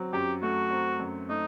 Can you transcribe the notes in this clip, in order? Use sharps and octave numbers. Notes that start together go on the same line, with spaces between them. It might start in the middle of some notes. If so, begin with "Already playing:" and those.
Already playing: F#3 C4
F#2 G4
A3 F#4
C4
F#2
A3 D#4